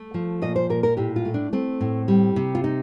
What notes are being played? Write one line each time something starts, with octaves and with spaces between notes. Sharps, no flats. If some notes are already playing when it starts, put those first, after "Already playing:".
Already playing: A3
F3
A#2 D#5
C5
A#2 A#4
A#4
A2 G4
F4
A3
D4
A3 C4
A2
G3
C3
F4
D#4